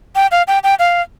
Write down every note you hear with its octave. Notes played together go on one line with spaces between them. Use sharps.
G5
F5
G5
G5
F5